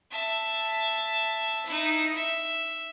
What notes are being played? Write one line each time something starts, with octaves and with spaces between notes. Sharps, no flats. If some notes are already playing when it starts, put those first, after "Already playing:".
E5 A5
D#4 E4
E5